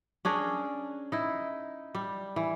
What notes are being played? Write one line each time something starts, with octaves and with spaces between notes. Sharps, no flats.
C#4 D4 G#4 A#4
D#4 E4
G3
E3